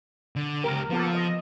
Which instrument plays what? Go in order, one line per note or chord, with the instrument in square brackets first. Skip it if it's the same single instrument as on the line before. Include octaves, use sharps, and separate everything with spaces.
[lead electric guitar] D3
[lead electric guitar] C#2 G4 [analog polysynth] A#4
[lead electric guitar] F3 [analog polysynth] A#3 B3 A4
[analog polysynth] D#5